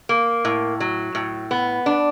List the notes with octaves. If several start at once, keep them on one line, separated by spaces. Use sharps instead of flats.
A#3
A2
F#3
A2
B3
D4